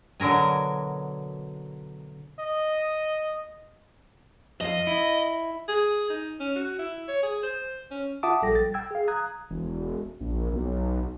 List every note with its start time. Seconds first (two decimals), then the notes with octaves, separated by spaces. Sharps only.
0.20 B2 D3 F#3 A#4 G#5
2.40 D#5
4.61 F2 F4 D#5
4.87 E4
5.68 G#4
6.10 D#4
6.40 C#4
6.56 F#4
6.79 E4
7.08 C#5
7.23 G#4
7.43 C5
7.91 C#4
8.23 F4 E5 F#5 A5 D6 D#6
8.42 A#1 G3 A4 G5 A#6
8.55 A6
8.74 G5 E6 G#6
8.91 G#4 F5
9.08 A#5 D#6 F#6 G#6
9.50 E1
10.20 A#1
10.53 B1